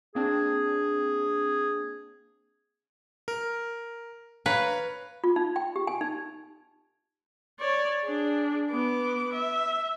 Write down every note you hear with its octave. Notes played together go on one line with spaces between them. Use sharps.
A#3 C4 D4 G#4
A#4
B4 C#5 F5 A#5
F4
D#4
G5
G4
G#5
D#4
C#5 D5
D4 G#4
B3 D6
E5